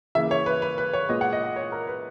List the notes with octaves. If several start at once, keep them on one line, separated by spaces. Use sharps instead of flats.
C#3 E3 A#3 E5
C#5
B4
B4
B4
C#5
A#2 G#3 B3 D#5
F#5
D#5
D#5
C#5
A#4
B4